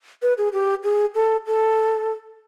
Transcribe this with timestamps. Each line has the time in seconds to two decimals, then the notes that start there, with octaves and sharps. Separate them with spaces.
0.22 B4
0.38 G#4
0.53 G4
0.84 G#4
1.15 A4
1.46 A4